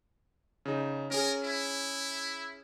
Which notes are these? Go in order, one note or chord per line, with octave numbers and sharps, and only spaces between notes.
C#3 D#4
C#4 G#4 A#4
E4